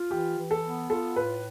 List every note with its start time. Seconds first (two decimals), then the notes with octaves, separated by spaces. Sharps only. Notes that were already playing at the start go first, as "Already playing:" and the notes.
Already playing: F4
0.11 E3 G4
0.38 E3
0.51 A4
0.64 B3
0.90 F4 A4
1.16 A2 B4